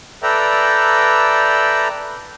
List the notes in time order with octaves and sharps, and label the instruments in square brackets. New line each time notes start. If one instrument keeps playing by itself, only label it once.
[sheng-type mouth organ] A4 B4 D5 E5 G5 A#5